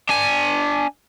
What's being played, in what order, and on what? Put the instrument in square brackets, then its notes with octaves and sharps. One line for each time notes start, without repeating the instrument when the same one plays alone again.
[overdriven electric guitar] D4 G#5